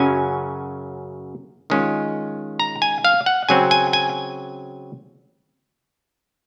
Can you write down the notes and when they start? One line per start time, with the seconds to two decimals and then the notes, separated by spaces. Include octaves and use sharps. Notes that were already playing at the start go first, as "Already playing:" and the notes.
Already playing: F#2 C#3 F#3 C#4 G#5
1.70 D#3 G#3 C#4 F4
2.59 A#5
2.82 G#5
3.05 F5
3.26 F#5
3.49 C#3 F#3 C4 G#5
3.71 G#5
3.93 G#5